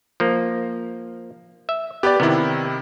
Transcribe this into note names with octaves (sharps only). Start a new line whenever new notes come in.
F3 A#3
E5
B3 G4 B4 D5
C3 D#3 B3 E4